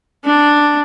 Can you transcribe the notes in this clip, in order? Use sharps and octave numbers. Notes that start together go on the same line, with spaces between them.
D4